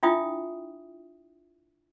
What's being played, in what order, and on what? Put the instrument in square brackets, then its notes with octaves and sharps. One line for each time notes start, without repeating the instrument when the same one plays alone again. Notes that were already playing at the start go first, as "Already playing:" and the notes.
[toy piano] D4 E4 F4 E5 G5 D#6